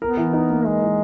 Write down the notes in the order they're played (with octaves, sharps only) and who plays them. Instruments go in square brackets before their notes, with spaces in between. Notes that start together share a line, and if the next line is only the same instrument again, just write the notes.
[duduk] B3 [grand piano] A#4
[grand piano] E3
D#4
A#3
[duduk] G#3 [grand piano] A#4
[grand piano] E3